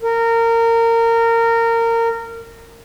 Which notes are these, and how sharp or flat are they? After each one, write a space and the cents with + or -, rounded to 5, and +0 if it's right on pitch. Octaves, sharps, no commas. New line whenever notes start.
A#4 -20